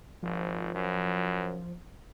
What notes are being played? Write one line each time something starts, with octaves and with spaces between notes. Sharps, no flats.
G#1 F3
F#2